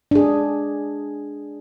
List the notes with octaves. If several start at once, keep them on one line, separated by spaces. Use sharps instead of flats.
D4 G#4